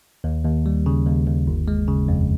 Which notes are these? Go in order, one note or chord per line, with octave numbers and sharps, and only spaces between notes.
D#2
D#2
G3
C#3
D#2
D#2
G1
G#3
C#3
F2